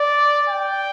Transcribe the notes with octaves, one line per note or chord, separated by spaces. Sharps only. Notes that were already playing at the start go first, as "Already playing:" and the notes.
Already playing: D5
G5